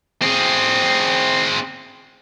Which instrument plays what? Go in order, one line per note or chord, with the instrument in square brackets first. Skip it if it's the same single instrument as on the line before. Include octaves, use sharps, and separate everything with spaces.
[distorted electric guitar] C4 G#4